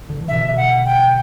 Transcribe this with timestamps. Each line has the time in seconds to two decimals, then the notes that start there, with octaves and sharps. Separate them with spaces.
0.10 D3
0.21 E3
0.28 B2 D3 E5
0.57 F#5
0.85 G5